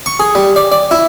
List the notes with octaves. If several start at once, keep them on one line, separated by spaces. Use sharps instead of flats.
C#6
G#4
G3
D5
D5
E4